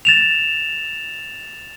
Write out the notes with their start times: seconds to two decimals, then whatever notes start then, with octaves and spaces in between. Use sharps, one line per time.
0.05 A6 E7 F7